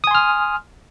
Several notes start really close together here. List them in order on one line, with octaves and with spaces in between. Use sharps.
D#6 G#5 C6 F6